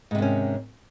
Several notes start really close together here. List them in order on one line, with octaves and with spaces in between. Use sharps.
G#2 C3 D#3 C#4